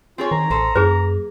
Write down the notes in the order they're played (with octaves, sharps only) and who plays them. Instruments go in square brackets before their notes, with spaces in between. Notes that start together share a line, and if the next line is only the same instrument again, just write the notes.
[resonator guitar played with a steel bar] C4 G#4 C#5 [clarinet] F4
[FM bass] D#3 [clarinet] A#5
[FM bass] A1 [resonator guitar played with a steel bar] A4 C5
[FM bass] F#2 [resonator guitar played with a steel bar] A#3 [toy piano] G#4 B4